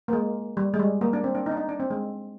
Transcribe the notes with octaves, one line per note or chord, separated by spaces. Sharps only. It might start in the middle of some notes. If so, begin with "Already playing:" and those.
A#3
G#3
G3
G#3
G3
A#3
D4
C4
D4
D#4
D4
D#4
D4
C4
G#3